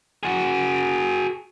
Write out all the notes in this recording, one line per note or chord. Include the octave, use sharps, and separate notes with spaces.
F#4 G#4